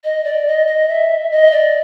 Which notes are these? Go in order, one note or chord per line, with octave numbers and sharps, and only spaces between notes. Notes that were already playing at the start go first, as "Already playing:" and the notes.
D#5
D5
D#5
D#5
E5
D#5
D5